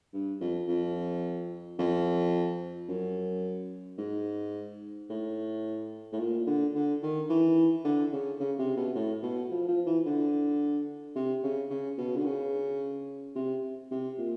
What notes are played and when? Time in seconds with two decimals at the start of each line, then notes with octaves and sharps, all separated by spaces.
0.13 G2
0.41 F2
0.68 F2
1.79 F2
2.88 F#2
3.98 G#2
5.10 A2
6.12 A2
6.19 A#2
6.47 D3
6.75 D3
7.02 D#3
7.29 E3
7.84 D3
8.12 C#3
8.40 C#3
8.59 C3
8.76 B2
8.95 A2
9.23 B2
9.51 F3
9.68 F3
9.86 E3
10.05 D3
11.15 C3
11.43 C#3
11.70 C#3
11.98 B2
12.16 D3
12.25 C#3
13.36 C3
13.91 C3
14.18 A#2